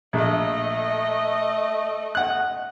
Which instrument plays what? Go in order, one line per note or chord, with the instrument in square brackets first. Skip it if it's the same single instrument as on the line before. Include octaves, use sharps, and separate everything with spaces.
[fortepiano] A#1 [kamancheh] A3 D#5
[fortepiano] F#5 F#6